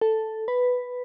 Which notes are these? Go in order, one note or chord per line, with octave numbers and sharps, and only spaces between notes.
A4
B4